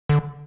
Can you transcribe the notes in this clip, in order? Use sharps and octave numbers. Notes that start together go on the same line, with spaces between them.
D3